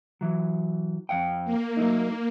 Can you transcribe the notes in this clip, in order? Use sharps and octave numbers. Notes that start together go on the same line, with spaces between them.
E3 F#3
F2 F5 G5
A#3
F#3 A3 D#4